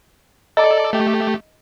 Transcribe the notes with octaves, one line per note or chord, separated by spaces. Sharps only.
A4 D5 D#5 A#5
A3 G4